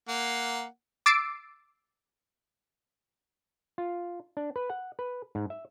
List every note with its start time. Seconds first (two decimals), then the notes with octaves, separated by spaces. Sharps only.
0.09 A#3 F#5
1.06 D6 E6 A6 C7 D7
3.78 F4
4.37 D4
4.56 B4
4.70 F#5
4.99 B4
5.35 G#2
5.50 E5